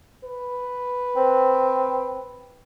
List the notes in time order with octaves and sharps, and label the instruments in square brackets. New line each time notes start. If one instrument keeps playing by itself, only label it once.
[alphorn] B4
[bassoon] C4